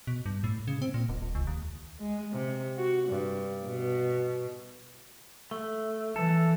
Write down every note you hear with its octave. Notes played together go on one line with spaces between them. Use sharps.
B2
G2
A2
C#3
C4
A#2
D#1
D#1
C#2
D#2
G#3
C3
F#4
G2
B2
A3
E3 A4